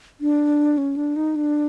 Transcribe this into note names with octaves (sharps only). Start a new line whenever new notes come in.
D4
C#4
D4
D#4
D4